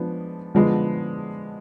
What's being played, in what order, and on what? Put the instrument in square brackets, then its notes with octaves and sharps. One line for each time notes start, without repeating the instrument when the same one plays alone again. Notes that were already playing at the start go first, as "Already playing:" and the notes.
Already playing: [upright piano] F3 G#3 B3 D4
D3 F3 G#3 B3 D4